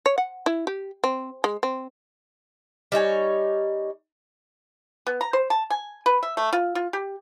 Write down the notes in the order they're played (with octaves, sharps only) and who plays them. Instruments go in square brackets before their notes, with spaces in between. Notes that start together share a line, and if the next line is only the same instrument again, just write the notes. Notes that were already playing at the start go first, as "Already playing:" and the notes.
[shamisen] C#5
F#5
E4
G4
C4
G#3
C4
[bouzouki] G3 D#4 C#5 G#5
[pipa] B3
A#5
C5
A5
G#5
B4
E5
A3
F4
F4
G4